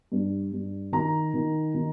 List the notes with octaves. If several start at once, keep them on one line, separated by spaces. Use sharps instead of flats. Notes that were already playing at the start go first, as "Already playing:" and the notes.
G2
G2
D#3 A#5
D#3
D#3